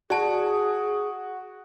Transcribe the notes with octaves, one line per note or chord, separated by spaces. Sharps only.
F#4 G#4 D5 A5